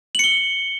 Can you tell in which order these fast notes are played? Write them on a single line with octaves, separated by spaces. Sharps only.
F#7 C#7 G7